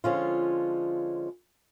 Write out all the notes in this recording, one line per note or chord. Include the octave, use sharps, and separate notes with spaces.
D3 F3 G#3 C#4 F4